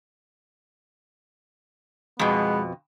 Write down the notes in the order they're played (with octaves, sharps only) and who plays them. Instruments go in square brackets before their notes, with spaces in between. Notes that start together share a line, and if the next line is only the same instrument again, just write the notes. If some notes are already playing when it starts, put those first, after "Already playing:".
[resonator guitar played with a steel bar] F2 B2 [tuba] G#3 [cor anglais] B3